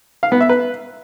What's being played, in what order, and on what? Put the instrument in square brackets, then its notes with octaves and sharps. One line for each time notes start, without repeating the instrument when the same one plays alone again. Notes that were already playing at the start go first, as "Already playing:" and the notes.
[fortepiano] F5
B3
E5
B4